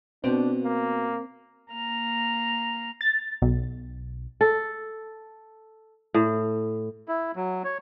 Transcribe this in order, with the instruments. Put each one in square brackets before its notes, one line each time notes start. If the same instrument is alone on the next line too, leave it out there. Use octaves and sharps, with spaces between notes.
[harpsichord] B2 [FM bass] C4 [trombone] D4
[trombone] A#3
[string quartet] A#3 A#5 F6
[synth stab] A6
B1
[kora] A4
A2
[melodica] E4
F#3
C#5